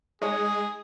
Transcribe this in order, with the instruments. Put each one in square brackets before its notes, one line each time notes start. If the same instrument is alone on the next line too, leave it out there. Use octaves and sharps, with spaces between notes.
[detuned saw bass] G#3 [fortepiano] D#4 C#5 G#5 [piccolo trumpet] G#4 [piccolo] D#6